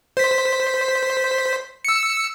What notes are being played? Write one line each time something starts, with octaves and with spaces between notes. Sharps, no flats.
C5 B6
E6 C#7